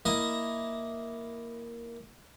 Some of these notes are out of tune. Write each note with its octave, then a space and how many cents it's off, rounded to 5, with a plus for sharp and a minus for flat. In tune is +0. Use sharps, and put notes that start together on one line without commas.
A#3 +0 E4 +0 D#5 +0